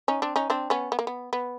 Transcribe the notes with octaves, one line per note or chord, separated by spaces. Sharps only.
C#4 D#4
C4 D4
C#4 D#4
C4 D4
B3 C#4
B3
A#3
B3
B3